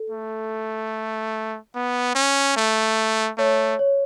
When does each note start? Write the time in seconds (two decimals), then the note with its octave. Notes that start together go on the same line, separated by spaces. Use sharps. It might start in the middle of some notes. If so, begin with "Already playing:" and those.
Already playing: A4
0.10 A3
1.75 B3
2.15 C#4
2.57 A3
3.38 A3 C#5
3.79 C#5